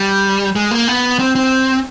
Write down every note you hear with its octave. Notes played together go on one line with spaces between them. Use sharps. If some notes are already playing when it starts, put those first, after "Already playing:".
Already playing: G3
G#3
A#3
B3
C4
C4